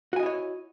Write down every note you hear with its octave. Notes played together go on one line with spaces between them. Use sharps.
E4 F#4 C#5 D#5 G#5